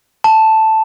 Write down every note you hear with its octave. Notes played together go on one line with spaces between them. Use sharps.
A5